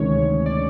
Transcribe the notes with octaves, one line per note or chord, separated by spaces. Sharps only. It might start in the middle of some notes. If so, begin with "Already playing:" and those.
Already playing: D2 C3 D#3 G#3 C#4 C#5
D5